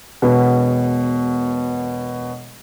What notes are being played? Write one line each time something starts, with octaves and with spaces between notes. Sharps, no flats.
E1 B2 F#4